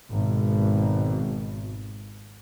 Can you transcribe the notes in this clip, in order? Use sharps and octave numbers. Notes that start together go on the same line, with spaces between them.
G#1 B2